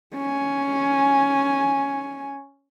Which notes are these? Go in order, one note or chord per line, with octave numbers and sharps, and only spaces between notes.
C#4 G#5